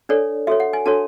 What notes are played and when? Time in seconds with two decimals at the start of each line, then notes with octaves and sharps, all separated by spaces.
0.09 D4 A4 C#5 D5
0.47 F#4 A4 C#5 E5
0.60 F#5
0.73 G#5
0.86 D4 F#4 A4 C#5 A5